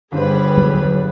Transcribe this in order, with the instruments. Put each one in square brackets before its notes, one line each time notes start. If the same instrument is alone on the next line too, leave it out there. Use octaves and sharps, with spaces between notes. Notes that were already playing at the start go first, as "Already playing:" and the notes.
[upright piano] G1 G2 C5 [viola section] G3 G#4 B4
[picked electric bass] F#3